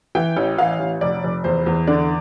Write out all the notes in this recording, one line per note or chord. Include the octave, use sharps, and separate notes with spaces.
E3 G5
A1
E3 F5
A1
F1 D5
F1
E2 C5
E2
D3 D5